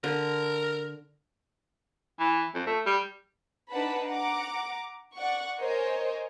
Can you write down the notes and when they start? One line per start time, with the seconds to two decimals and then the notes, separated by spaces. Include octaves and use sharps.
0.04 D3 A#4
2.20 E3
2.55 F2
2.67 A3
2.86 G3
3.69 D4 D#4 B4 F#5 A5 B5
4.06 F#5 A#5 D6
5.14 D5 F#5 C#6
5.58 A#4 C5 C#5 D#5 G#5